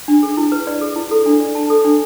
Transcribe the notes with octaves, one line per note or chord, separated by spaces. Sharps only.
D4
G#4
E4
B4
D5
G#4
E4
A4
D4
D5
A5
A4
D4